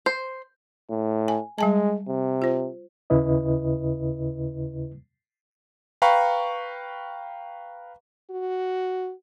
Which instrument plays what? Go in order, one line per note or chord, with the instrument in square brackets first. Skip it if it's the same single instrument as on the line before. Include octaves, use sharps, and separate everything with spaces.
[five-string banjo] C5
[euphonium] A2
[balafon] G#5
[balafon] G3 G#5 A5 [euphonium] G#3
[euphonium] C3
[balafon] F4 C5
[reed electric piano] D#2 C#3 E4 B4 D#5
[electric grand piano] B4 F5 G5 A#5 B5 C#6
[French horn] F#4